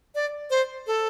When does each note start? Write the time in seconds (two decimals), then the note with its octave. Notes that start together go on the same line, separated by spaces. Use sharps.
0.15 D5
0.50 C5
0.87 A4